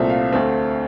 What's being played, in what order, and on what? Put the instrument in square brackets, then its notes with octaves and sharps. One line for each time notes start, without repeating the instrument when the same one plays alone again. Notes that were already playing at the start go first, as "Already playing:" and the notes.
Already playing: [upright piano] C2 A#2 A3 C4 E5
F5
D2 D3 A3 C4